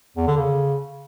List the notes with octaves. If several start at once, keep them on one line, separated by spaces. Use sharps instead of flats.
E2
D3
C#3